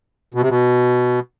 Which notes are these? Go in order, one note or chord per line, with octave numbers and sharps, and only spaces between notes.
B2
C3
B2